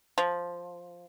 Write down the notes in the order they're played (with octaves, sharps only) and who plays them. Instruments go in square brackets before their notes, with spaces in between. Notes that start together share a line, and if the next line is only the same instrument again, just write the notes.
[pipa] F3